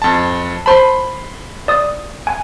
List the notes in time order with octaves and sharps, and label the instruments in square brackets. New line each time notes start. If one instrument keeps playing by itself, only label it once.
[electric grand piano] F2 A5
[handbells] C5 A5 [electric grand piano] B5 C6
[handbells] D5 D#6
G#5